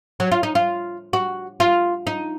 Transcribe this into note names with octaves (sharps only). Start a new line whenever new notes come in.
F#3
F4
D#4
F4
F#4
F4
D#4